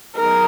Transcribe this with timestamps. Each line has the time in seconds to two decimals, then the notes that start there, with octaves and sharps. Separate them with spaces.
0.16 F#3 B3 D#4 G#4 A#4